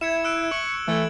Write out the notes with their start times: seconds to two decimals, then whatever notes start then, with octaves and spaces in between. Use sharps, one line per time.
0.01 E4 E5 G#6 C#7 E7
0.24 E6 F#6 D7
0.51 C#6 C#7 F#7
0.88 E3 A3 A4 E6 G#6